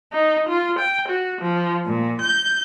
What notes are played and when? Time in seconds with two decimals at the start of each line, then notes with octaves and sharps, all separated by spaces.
0.13 D#4
0.49 F4
0.78 G5
1.07 F#4
1.40 F3
1.85 A#2
2.20 G6